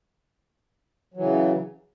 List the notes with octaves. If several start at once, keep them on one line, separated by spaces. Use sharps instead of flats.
C#3 E3 F#3